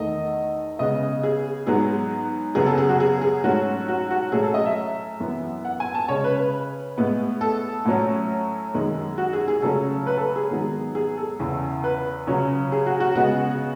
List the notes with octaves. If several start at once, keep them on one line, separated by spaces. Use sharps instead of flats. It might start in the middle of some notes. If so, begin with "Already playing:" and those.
Already playing: E2 D#3 A3 D#5
C#3 G#3 B3 D#5
G#4
G#2 F#3 B3 G#4
F#2 C#3 F#3 B3 G#4
A4
G#4
F#4
G#4
G#4
G#2 F#3 A3 C#4 F#4
F#4
F#4
A2 F#3 A3 C#4 G#4
A4
D#5
E5
F#2 E3 B3
F#5
G#5
A5
C#3 G#3 C#4 C#5
B4
B4
A2 G#3 B3
A4
A2 F#3 C#4
F#2 D#3 G#3
F#4
G#4
G#4
C#3 F#3 A3 C#4 A4
B4
A4
B4
G#4
G#2 D#3 F#3 B3
G#4
A4
E2 C#3 E3
B4
C#3 F#3 C#4
G#4
F#4
F#4
C#3 G#3 B3 F#4